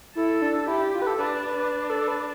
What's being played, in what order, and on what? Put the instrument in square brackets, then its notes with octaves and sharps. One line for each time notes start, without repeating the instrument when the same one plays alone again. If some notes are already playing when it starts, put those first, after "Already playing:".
[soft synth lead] E4 [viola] A4
[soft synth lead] D4
[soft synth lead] E4 [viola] G4
[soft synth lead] F4
B4
A4
[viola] D4 [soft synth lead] B4
[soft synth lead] B4
B4
B4
B4
A4
B4